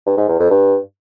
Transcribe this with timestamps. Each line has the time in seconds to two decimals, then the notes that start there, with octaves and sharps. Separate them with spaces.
0.06 G2
0.17 G#2
0.28 E2
0.39 F2
0.50 G2